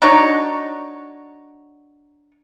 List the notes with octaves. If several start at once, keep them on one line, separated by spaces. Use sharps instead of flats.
D4 D#4 F#4 C#5